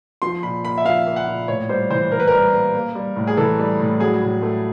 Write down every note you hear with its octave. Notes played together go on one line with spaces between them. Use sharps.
F3 C6
A#2 B5
A#3 B5
E5
F3 F5
A#3
F#5
A#2
A2 C#5
G3 C5
E3 C5
E3 A#4
B4
G3 A#4
A#3
A#3
G3
A2
G#4
E3 A4
G3
A2
F#3 G#4
A2
A3